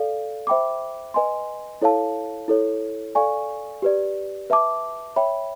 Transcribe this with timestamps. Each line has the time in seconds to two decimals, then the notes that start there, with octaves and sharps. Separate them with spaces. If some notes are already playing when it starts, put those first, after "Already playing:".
Already playing: A4 D5 F5
0.47 C5 E5 G5 B5 D6
1.14 B4 D#5 G#5 C6
1.82 E4 A4 C#5 F5 A5
2.48 E4 A4 C#5
3.15 A4 D5 F5 G#5 C#6
3.82 G4 B4 D5
4.50 B4 E5 A5 D6
5.16 C#5 E5 G5 B5